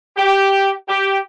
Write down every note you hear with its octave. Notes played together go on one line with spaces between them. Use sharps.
G4
G4